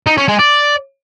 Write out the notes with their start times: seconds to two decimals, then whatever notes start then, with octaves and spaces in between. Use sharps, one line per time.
0.07 D#4
0.17 C#4
0.28 G#3
0.39 D5